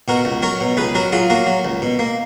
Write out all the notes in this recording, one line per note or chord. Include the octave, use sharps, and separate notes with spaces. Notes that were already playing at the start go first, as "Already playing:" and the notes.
B2 F#4 A#4
C#2
F#3 A#4 C#5
B2
C#2 G#4 B4
F#3 F#4 A#4
F#3 F4 G#4
A#3 F#4 A#4
F#3
C#2
B2
A#3